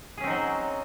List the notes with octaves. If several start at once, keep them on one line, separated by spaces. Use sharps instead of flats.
F#3 C4 C#4 D#4 G#4